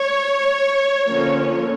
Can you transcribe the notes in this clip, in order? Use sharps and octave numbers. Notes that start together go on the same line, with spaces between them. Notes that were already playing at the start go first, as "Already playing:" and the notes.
Already playing: C#5
D3 F3 A#3 C#4